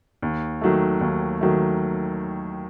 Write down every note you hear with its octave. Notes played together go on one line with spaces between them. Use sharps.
D#2
D#3 F#3 A3
D#2
D#3 F#3 A3